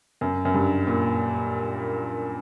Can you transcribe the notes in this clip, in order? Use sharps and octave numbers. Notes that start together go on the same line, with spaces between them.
F#2
F#2
G2
A#2